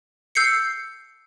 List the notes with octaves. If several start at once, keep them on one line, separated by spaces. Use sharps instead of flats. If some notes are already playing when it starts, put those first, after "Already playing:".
E6 G6 C7 C#7